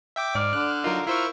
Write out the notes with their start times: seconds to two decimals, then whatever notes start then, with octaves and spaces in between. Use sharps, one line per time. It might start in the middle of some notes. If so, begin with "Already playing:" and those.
0.16 E5 G5 D6
0.35 G#2 D5 F6
0.53 D3 F#6
0.84 F#3 D#4 F4 A#4
1.07 E4 F4 C5 E5 C#6